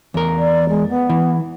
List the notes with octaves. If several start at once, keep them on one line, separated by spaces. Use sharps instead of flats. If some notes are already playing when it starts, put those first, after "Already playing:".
E2 A#4
D5
G#3
B3
E3